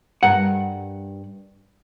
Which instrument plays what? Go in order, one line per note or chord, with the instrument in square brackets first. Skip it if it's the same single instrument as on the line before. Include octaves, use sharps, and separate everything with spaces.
[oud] G2 A#4 [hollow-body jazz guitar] F#5